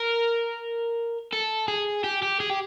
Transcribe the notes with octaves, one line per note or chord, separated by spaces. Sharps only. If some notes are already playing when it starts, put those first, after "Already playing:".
Already playing: A#4
A4
G#4
G4
G4
G#4
G4